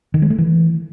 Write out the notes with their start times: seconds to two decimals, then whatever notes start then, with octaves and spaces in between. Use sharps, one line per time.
0.14 D#3
0.22 G#3
0.30 A3
0.38 E3